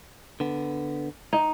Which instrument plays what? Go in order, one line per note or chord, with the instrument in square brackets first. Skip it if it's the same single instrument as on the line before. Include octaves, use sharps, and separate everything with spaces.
[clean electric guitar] D3 B3
[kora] D#4